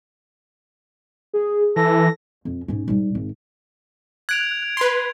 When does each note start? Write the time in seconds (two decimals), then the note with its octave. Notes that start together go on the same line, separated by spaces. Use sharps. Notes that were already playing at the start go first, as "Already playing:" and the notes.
1.33 G#4
1.76 E3 A4 A#6
2.45 F2
2.68 G#2 C#4
2.88 G#2 G3
3.15 G#1
4.29 F#6 G#6 D7 F7
4.77 B4 C6 D7